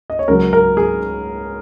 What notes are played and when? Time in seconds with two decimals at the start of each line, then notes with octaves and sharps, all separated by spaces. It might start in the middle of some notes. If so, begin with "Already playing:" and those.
0.10 D#5
0.19 C#5
0.28 C#2 C#3 F#3 A#4
0.53 A#4
0.77 G#4